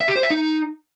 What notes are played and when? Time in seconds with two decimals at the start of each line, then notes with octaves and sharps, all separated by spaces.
0.01 E5
0.08 G4
0.15 C5
0.23 E5
0.30 D#4